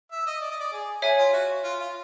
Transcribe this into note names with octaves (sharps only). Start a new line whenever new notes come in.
E5
D#5
D5
D#5
D5
G#4
G#4 C#5 E5 G#5
F4
F#4
F4
F4